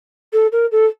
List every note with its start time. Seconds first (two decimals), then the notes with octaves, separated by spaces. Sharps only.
0.33 A4
0.52 A#4
0.72 A4